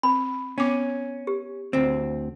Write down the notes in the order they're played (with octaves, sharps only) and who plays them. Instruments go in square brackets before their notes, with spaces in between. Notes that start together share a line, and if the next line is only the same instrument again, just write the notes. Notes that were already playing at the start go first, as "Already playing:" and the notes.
[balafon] C4 [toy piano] B5
[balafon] B3 D6 [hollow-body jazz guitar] C#4
[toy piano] G4
[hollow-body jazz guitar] D2 C4